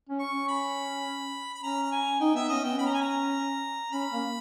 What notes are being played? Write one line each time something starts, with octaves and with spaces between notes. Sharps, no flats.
C#4
C#6
C#4
B5
B5
C#4 A#5
A#5
G#5
D#4 G5
B3 E5
C#4 D#5
B3 G5
C#4 B5
A#5
G#5
A#5
C#4 B5
A#3